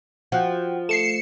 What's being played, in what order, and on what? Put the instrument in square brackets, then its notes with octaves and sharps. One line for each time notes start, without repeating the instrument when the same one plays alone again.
[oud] F3 [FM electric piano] F#4 F#5 G5
[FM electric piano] A3 [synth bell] C7 C#7 E7